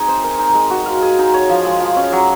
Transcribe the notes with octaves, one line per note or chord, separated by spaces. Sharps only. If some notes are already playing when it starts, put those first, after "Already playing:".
Already playing: C4 D#4 G#4
C5
A#4
D#4
G#3
F#4
F5
G#4
D#4
C#5
F3
G#3
F3
C#4
F#3